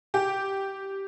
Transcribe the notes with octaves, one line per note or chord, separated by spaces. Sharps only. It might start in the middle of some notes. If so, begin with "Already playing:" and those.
G4